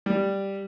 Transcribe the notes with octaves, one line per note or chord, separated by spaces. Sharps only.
G3